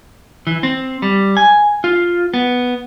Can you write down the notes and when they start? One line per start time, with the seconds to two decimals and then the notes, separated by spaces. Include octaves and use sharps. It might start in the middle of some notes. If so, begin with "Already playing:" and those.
0.47 E3
0.63 C4
1.02 G3
1.37 G#5
1.84 F4
2.34 B3